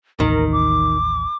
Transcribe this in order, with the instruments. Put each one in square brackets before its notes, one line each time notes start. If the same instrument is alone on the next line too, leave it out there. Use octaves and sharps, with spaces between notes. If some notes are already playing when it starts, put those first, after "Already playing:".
[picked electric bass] A1 D#2 [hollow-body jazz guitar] D#3 [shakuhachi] A#4
[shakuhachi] D6